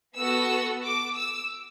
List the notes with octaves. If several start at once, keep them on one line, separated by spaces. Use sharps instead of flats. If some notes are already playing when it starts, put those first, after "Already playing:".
B3 F#4 A4 E6
D6
E6